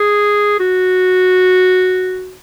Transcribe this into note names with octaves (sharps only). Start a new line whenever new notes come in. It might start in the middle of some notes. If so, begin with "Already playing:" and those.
Already playing: G#4
F#4